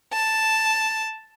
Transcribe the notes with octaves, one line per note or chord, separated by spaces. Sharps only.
A5